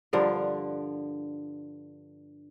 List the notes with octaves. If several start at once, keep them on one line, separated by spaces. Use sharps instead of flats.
G2 D3 F3 A#4